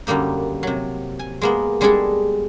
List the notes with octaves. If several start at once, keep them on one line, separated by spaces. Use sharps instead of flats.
F#2 D3 G3 A#3 D#4
C3 F#3
G#5
G#3 A#3 B3
G3 G#3 D4 E4 G#4 A4